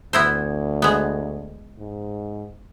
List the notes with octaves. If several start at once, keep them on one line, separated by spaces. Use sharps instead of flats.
D2 B3 E4 C5
G#3 B3
G#2